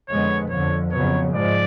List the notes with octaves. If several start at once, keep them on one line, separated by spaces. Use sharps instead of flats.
F2 D3 G#3 B3 C#5
F2 D3 F3 C#5
F2 C#3 F#3 B3 C#5
G#2 F3 G#3 D5